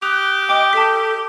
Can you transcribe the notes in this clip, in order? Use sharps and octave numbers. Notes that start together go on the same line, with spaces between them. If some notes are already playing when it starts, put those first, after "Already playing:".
G4 D#6 F#6 F7
D#5 G5 D6 D#6
A4 A5 B6